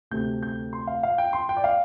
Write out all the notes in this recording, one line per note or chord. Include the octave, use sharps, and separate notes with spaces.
D2 C3 A3 G6
G6
C6
F5
F5
G5
C6
G5
D5
F5